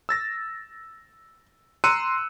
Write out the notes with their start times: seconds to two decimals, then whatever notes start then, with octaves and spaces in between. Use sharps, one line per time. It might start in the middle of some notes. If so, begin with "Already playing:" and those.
0.09 E6 A6 A#6
1.84 A#5 C6 E6 F#6 C#7 D#7